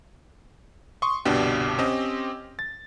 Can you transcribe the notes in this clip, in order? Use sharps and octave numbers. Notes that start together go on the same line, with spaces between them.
C6 C#6 D#6
G1 C2 B2 D4 G4
C4 C#4 G4 D#5
A6